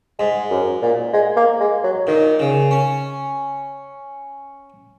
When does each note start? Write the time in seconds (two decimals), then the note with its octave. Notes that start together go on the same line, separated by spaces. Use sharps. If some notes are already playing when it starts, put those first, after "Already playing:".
0.19 G#2 G#3
0.50 F#2
0.82 A#2
1.13 G#3
1.36 A#3
1.60 G#3
1.84 F#3
2.07 A#2 D#3
2.40 C#3
2.71 C#4